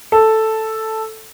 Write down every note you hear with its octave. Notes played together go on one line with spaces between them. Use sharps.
A4